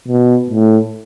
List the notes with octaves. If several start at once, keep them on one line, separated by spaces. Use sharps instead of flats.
B2
A2